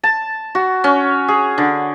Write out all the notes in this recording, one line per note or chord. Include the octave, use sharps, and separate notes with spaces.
A5
F#4
C#4
G#4
D3